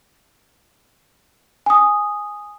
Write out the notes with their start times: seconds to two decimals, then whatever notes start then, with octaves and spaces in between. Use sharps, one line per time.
1.66 G#5 D#6